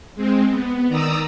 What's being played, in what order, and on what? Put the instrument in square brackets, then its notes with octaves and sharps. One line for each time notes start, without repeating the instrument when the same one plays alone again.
[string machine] G#3 C4
B3
D#3 D5 A#5 D#6 E6